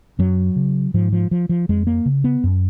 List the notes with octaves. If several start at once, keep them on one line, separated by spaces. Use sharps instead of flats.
F#2 F#3
C#3
G#2 F3
F3
F3
F3
F2 G#3
A#3
C#3
B3
F#2